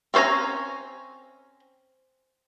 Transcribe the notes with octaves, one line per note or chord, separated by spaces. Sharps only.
C4 C#4 C5 G#5 A#5